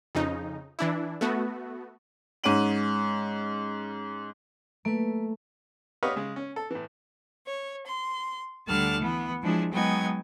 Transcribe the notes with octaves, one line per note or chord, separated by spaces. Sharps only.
F2 C#3 D#4
E3 D4 E4
A3 B3 F#4
G#2 C#4 D#7 F#7
A3 A#3 B4
G4 B4 C#5 D#5 F5 F#5
C#3 G#3
C#4
A4
A2 E3
C#5
C6
D2 D3 G3 A5 F6 F#6
E3 B3
F3 G#3 D4 E4 G#4
F#3 G#3 B3 D#4 G5 G#5